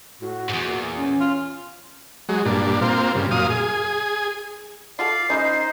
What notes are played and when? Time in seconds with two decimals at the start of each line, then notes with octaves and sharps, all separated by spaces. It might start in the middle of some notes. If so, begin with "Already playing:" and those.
0.21 A2 F#4
0.49 E2 G#2
0.65 A#2
0.97 C#4
1.20 F4
2.29 F#3 G#3
2.45 G2 A#2 D4
2.82 A#3 C4 F4
3.15 G2 C#3
3.31 F#2 A#2 F5 D#6
3.50 G#4
4.99 F4 F#4 A4 D5 F5 C7
5.30 C#4 D#4 E4 C5 D#5